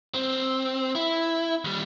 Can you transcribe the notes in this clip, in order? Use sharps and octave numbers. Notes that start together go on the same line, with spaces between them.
C4
E4
D#2 G3